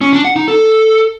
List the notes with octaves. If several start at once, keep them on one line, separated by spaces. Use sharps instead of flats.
C#4
D4
F#5
D#4
A4